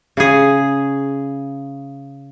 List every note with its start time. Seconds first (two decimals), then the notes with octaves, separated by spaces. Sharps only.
0.17 C#3 G#4